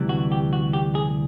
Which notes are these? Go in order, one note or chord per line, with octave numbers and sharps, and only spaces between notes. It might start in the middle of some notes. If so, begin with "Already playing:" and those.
Already playing: D2 C3 E3 G3
F#4
G4
F#4
G4
G#4